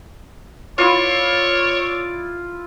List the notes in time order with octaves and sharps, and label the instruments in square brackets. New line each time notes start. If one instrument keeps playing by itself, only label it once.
[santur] E4 F4 [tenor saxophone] C#5 [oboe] D5